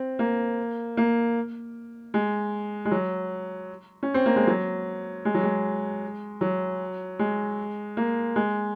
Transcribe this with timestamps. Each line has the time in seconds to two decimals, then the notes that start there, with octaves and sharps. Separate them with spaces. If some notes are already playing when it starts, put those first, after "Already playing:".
Already playing: C4
0.19 A#3
0.97 A#3
2.14 G#3
2.85 G#3
2.91 F#3
4.03 C#4
4.14 C4
4.26 A#3
4.36 G#3
4.47 F#3
5.25 G#3
5.34 F#3
5.44 G#3
6.41 F#3
7.19 G#3
7.97 A#3
8.36 G#3